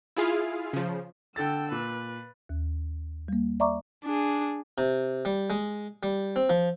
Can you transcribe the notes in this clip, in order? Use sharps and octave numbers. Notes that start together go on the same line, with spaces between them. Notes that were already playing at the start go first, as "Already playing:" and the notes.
E4 F4 G#4 F5
C#3 F3
D3 A4 G5 E6 A6
A#2 B4
D#2
G3 A#3
D5 E5 A#5 C#6 D6
D4 G#4
C3
G3
G#3
G3
C4
F3